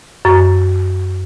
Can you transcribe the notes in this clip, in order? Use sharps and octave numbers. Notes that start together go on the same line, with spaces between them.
F#2